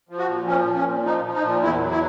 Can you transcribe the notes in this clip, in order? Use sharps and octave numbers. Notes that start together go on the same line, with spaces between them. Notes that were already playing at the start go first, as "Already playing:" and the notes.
F3
F#4
A#2
F3 C#4
A#2
C#4
A#2
F3 D#4
F3
D#4
A#2
E2 E4
F#3
E4